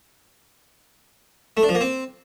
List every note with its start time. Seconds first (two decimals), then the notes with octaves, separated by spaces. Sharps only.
1.57 A3
1.63 D4
1.69 F3
1.75 A#3
1.81 C4